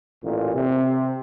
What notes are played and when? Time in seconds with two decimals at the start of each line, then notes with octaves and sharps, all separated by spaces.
0.23 A1 A#2
0.55 C3